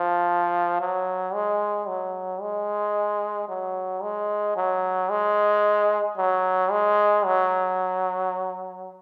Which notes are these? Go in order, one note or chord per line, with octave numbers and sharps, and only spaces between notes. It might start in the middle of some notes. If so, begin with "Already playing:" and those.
Already playing: F3
F#3
G#3
F#3
G#3
F#3
G#3
F#3
G#3
F#3
G#3
F#3